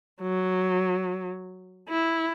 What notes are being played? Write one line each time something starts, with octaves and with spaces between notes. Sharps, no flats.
F#3
E4